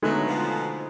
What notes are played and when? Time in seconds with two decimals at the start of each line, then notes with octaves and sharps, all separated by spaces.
0.03 A2 D3 F#3 G#3 A3 B3 D#4
0.27 B2 F3